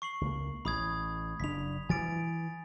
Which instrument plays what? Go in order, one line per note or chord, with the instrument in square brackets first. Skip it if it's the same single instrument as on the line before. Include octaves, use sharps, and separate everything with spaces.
[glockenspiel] C#6 C7 F#7
[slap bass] C#2 A#3
[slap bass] A1 [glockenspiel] B5 D#6 G#6
[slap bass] F#1 D4 [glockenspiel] B6 F7
[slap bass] E3 [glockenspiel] G#5 A6 D7